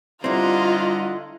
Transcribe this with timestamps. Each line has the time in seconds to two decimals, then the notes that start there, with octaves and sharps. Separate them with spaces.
0.24 D3 G3 C4 E4 F4 D#5 F#5 A#5